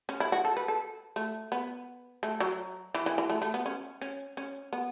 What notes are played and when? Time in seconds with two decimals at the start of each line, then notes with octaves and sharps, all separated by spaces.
0.09 C#4
0.20 E4
0.32 F#4
0.45 A4
0.57 B4
0.68 A4
1.16 A3
1.52 B3
2.23 A3
2.40 F#3
2.94 E3
3.06 E3
3.18 E3
3.30 A3
3.42 A3
3.54 B3
3.66 C#4
4.01 C#4
4.37 C#4
4.73 B3